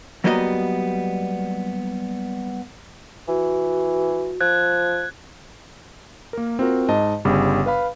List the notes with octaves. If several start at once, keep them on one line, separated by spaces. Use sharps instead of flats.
F#3 G3 A#3 B3 F#4 D#5
E3 F#4
F3 F#6 G#6
A#3 A#4
C4 F4 F#4 A#4
G#2 D#5 A5
G1 C#3 G3
B4 F5 B5